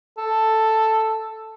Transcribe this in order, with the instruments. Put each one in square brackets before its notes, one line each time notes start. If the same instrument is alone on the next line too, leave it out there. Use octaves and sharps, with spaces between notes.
[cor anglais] A4